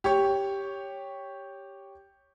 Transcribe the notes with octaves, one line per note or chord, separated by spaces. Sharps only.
G4 C#5 C#6